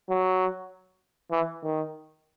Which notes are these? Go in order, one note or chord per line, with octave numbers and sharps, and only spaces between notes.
F#3
E3
D#3